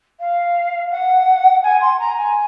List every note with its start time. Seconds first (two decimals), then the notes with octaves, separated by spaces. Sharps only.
0.20 F5
0.91 F#5
1.63 G#5
1.81 C6
1.99 A#5
2.17 G#5